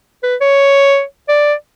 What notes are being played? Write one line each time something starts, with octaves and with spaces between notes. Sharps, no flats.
B4
C#5
D5